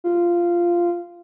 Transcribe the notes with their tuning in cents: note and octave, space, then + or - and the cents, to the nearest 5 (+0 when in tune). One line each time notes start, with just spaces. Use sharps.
F4 -10